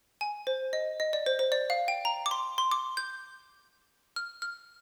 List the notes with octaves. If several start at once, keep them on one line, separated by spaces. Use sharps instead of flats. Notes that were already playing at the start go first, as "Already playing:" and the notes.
G#5
C5
D#5
D#5
D5
C5
C5
D5
F5
G5
A#5
D6
C6
C6
D6
G6
F6
F6